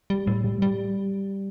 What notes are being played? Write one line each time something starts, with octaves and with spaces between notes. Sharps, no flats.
G3
A2
G3
G3